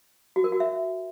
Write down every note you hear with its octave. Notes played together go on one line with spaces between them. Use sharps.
F#4
A#4
F#4
E5